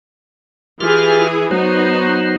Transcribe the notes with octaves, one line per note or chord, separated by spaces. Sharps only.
E3 F4 G4 G#4 F6
F#3 B3 D#4 F#4 C5